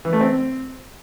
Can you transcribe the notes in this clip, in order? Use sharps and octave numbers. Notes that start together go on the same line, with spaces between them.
E3
A3
C4